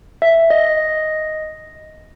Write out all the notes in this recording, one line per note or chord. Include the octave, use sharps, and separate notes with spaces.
E5
D#5